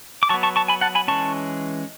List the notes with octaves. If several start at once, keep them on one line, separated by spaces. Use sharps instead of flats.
D6
F#3 B3 A5 C#6
A5 C#6
A5 C#6
G#5 B5
F#5 A5
G#5 B5
E3 G#3 C#4 A5 C#6